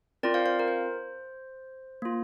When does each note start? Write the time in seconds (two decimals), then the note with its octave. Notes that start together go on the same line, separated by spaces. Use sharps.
0.23 C4 F4 A#4 D5
0.34 C5 F5
0.46 C5 F5
0.59 A#4
0.68 C5
2.02 A#3 F4